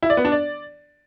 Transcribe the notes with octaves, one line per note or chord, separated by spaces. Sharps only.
E4
D5
B3
D4
D5